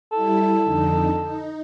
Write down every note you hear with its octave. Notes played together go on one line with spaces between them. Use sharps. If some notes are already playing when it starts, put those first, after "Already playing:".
G3 E4 A4
F2 D3 D#4
D#4